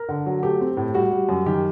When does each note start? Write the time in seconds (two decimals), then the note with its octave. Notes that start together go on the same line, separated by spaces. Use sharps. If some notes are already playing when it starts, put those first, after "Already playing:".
Already playing: A#4
0.09 D3
0.26 F#3
0.43 A3 G4
0.61 C4
0.77 A2
0.94 G3 F#4
1.11 G3
1.29 F#2
1.46 D#3 G4